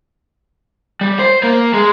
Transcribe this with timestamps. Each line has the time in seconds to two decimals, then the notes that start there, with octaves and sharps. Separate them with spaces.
1.01 G3
1.19 C5
1.43 A#3
1.74 G#3